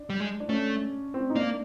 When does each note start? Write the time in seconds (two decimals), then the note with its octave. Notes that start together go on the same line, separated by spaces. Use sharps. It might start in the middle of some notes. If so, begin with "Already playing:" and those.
Already playing: D4
0.10 G3
0.20 G#3
0.40 D4
0.49 A3 C#4
1.14 C4
1.30 D#4
1.35 A#3 D4